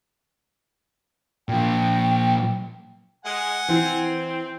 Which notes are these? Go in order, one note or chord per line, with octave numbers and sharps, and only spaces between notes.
A#2 F3 G5
G#3 F#5 G#5
E3 C4